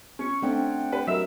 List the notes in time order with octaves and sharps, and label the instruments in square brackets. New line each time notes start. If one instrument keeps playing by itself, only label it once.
[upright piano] C#4 [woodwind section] C#6
[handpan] A3 C4 D4 [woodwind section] D5 F#5 G5
[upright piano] B4
[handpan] F#3 [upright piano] A#4 D#5 E5 [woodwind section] E6